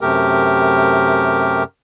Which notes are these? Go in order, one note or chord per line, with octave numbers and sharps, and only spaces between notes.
F#2 C3 A3 G4 A#4